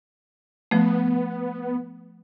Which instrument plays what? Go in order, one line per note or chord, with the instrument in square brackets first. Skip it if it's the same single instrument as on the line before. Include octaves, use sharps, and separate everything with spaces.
[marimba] F3 A3 [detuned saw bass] B3